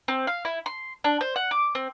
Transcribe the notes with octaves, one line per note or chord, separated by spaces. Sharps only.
C4
F5
E4
C6
D4
C5
F#5
D6
C4